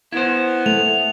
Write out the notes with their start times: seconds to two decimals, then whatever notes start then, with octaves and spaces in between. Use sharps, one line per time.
0.13 B3 E4 C5
0.66 A3 F7